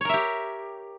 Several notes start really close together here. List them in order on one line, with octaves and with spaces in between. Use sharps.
C#5 A#4 E5 G4